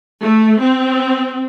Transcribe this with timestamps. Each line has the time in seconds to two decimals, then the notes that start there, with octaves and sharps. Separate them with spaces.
0.22 A3
0.63 C4